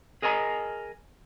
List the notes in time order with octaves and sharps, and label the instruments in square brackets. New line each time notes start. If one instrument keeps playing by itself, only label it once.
[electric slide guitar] G#4 A#4 D#5 G#5 A#5